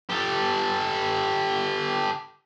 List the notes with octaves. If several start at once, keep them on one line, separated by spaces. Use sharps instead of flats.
G4 A4